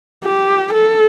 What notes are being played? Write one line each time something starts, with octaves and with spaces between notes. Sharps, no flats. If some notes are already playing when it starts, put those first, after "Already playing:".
G4
A4